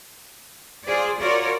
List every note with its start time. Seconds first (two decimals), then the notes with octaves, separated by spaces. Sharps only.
0.86 F4 G#4 C5 D5
1.20 F4 F#4 A#4 C#5 D5